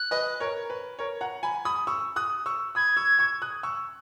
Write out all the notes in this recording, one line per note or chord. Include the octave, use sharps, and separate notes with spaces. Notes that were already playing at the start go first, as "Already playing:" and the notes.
Already playing: F#6
B4 D#5
A#4 C#5
B4
A#4 C#5
F#5 A#5
G#5 B5
B5 D#6
C#6 E6
D#6 F#6
C#6 E6
B5 D#6 G#6
C#6 E6
C#6 E6
D#6 F#6
C#6 E6